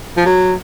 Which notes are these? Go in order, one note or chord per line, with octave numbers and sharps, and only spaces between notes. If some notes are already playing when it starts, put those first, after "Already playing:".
F3
F#3